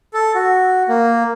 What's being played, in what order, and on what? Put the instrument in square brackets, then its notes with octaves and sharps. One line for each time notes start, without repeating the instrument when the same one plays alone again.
[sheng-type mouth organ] A4
F#4
A#3